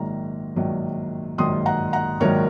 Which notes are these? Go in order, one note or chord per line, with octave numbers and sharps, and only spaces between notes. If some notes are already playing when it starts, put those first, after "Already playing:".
Already playing: A#1 G#2 D#3 F#3 A#5
A#1 G#2 D#3 F#3
A#1 G#2 D#3 F#3 C6 D#6
F#5 A#5
F#5 A#5
A#1 G#2 D#3 F#3 A#4 C#5